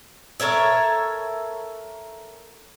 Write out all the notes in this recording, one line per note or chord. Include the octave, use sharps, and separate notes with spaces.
A4 A#4 C#5 E5